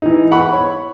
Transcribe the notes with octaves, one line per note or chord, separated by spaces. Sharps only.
E3 D#4
F#5 B5 C#6
C#5